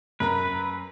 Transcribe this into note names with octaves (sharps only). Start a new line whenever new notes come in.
F#2 A#4 B4 A#5